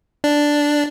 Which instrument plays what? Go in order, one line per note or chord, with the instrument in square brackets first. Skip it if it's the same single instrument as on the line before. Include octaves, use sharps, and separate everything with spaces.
[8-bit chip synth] D4